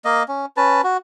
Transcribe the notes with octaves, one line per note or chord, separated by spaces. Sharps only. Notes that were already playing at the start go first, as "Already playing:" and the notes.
A#3 D#5
C#4
C#4 B4 A5
F#4